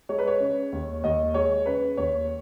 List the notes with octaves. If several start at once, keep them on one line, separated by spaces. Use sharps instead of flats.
G#3 C#5
B4
C#5
C#3
D#2
D#2 D#5
G#3 C#5
C#3 B4
D#2 C#5